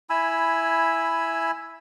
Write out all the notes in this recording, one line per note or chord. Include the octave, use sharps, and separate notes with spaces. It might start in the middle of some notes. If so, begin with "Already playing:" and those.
E4 G#5 B5 E6